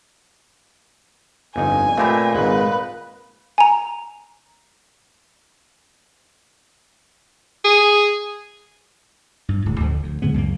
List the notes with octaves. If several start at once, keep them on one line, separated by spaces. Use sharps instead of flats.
G1 F2 D#4 G#5
A#2 A3 C4 G4 D#5 B5
G#1 G#2 B4
G#5 A#5
G#4
G2
D1 A2
D2 D3 F3
D2
A#2 D3 G#3 B3
C#2 F#2 G3 A#3